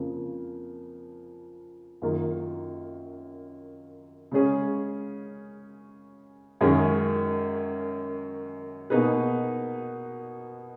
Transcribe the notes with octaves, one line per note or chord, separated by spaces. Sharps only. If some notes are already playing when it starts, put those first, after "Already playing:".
Already playing: F2 C#3 F3 A#3
F#2 D#3 A#3 F4 A#4
C#3 G#3 C#4 G#4 C#5
F#2 D#3 G#3 C#4 G#4
B2 A#3 D#4 G#4 B4